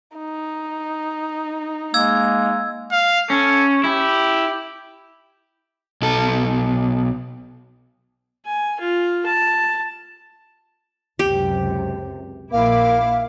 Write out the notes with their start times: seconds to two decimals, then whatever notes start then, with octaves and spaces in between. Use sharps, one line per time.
0.18 D#4
1.94 G#3 A#3 E6 G#6
2.92 F5
3.30 C#4 A4
3.84 E4 G4
6.02 B1 A4
8.46 G#5
8.80 F4
9.26 A5
11.19 C#2 F#2 C3 G4
12.52 A#1 A#3 E4 F5 D6